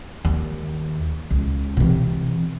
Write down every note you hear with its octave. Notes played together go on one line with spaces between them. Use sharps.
D#2
C#2
C3 E3